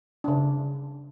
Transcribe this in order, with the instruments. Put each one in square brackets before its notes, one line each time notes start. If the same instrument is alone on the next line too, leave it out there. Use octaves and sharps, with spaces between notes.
[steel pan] C#3 D4